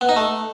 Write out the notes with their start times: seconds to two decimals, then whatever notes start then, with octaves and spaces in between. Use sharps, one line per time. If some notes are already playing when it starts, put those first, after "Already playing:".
0.01 B3
0.09 D#4
0.16 A3